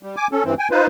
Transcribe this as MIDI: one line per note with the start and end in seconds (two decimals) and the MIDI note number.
0.03 0.16 55
0.16 0.28 80
0.16 0.28 86
0.32 0.44 61
0.32 0.44 69
0.44 0.54 43
0.44 0.54 52
0.44 0.54 60
0.59 0.68 79
0.59 0.68 80
0.71 0.87 63
0.71 0.87 65
0.71 0.87 71
0.71 0.87 72